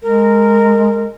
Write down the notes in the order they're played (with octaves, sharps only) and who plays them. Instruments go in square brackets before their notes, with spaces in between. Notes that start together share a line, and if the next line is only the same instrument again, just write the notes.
[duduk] G#3 [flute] A#4